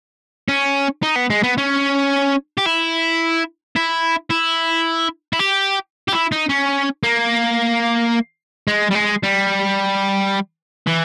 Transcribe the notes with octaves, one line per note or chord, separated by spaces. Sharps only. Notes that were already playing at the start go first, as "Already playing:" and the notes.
C#4
D#4
B3
G#3
B3
C#4
G4
E4
E4
E4
E4
G4
G4
E4
D#4
C#4
A#3
G#3
G3
G#3
G3
E3